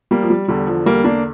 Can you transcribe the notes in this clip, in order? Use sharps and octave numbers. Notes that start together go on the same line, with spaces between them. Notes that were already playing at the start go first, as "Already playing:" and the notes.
G3 A#3
F3
G3
E2 D3 G3
F3
G3 A#3
A#3 D4